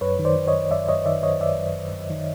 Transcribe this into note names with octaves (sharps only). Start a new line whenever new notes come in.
F#2 B4 C#5
D#3
C5 D5
D#3
C#5 D#5
F#2
F#2 D5 E5
F#2 C#5 D#5
D#3 D5 E5
F#2 C#5 D#5
F#2 D5 E5
F#2
F#2
F#2
D#3